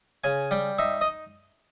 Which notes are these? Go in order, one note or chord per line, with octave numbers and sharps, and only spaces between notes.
C#3 G#5
G3 G5
D#4 E5
D#5